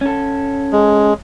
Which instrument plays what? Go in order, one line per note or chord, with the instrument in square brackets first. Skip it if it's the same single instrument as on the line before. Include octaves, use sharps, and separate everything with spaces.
[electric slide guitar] C#4 A4
[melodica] G#3